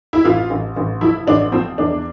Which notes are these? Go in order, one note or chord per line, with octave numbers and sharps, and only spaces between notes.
E4
A1 F4
A1
A1
F3 E4
A1 D4
F3 C4
E2 D4